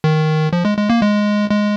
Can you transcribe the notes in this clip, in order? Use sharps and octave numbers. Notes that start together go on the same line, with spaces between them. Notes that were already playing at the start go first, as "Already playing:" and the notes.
D#3
F3
G#3
G#3
A#3
G#3
G#3